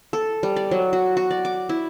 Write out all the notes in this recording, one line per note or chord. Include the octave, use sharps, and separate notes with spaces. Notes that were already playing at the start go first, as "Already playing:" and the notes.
A4
G3
D5
F#3
F#4
F#4
D5
D6
E4